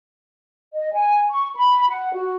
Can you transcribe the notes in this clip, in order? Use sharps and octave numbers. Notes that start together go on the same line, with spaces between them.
D#5
G#5
C#6
B5
F#5
F#4